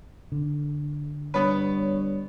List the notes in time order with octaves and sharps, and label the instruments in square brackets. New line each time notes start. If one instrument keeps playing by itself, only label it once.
[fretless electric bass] D3
[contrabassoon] G2 [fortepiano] B3 B4 [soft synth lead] C#5